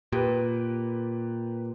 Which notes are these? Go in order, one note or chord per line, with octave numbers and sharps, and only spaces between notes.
A#2 G4 B4